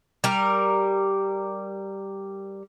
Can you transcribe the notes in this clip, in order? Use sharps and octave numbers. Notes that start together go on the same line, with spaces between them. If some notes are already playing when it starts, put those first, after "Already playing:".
G3 A#4